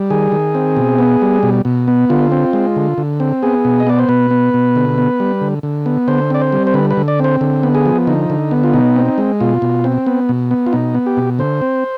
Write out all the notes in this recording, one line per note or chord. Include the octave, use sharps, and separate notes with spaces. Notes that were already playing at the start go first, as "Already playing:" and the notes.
Already playing: G3
D#3 G#4
D#3
C4
B2
B3
G3
B2
B2
B3
D3 F4
C4
G#3
D3
D3
C4
B3 G#4
B2
D#5
B3 D5
C5
B2 B4
B3
B2
D3
B3
G3
D3
D3
B3
D3 C5
C4 D5
C5
G3
C5
D3 B4
B4
D3
D5
C4 C5
D3
B3
G#4
F3
D3 D#4
D3
B3
F4
B2 D#4
C4
G#3
B2 F4
B2
C4
B3
B2
B3
F4
B2 D#4
B3
G4
B2
D3 C5
C4